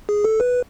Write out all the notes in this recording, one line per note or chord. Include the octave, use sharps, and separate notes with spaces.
G#4
A4
B4